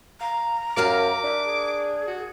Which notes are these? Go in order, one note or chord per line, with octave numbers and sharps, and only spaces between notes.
F5 A#5
F#2 G4 A#4 F5 D6
D4 E5
G#4
F#4